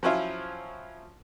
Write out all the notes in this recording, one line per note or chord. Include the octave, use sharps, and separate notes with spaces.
F3 F#3 C#4 E4 F4